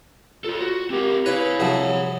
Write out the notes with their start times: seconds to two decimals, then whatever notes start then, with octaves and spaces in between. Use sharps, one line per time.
0.44 F4 A4 C5
0.60 F#4
0.90 C4 G4 A#4
1.26 E4 B4 C#5 F5
1.60 C2 F3 F#3